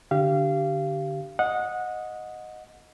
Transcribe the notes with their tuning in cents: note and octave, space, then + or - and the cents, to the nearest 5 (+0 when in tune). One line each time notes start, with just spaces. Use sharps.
D3 +0 G4 -20 F5 -25
D#5 +0 F#5 -20